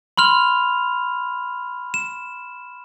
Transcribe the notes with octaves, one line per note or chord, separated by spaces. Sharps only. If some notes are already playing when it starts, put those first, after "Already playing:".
B5 C6 F6 F7
E7